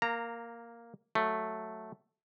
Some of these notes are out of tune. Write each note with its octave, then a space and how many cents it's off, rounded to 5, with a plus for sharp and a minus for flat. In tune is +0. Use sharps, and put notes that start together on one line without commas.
A#3 +0 A#5 -20
F#3 +0 A3 +0